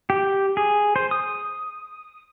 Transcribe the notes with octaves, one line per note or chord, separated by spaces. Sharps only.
G4
G#4
C5
D#6